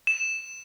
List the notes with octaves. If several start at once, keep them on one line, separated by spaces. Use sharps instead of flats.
E7